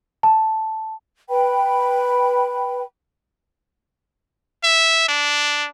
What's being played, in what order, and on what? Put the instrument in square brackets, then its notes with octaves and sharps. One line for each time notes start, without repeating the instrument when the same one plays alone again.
[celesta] A5
[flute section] B4 G5 B5
[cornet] E5
D4